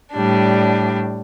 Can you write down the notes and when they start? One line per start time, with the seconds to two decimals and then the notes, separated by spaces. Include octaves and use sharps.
0.13 A2 G3 D4